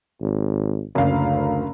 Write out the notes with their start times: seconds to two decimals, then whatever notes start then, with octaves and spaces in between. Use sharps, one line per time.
0.21 G#1
0.95 F#1 D2 F5